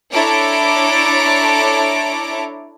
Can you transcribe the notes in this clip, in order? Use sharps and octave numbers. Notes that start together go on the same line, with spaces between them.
D4 E4 A4 C#5 A#5 D6